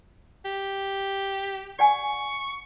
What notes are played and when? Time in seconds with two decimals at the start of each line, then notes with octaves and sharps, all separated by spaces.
0.45 G4
1.79 D5 F#5 G#5 C#6